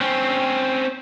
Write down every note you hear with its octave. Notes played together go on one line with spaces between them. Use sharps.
C4 C#4